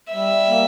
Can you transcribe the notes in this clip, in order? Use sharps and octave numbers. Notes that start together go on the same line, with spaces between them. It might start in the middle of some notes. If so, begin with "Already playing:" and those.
G3 E5
A#3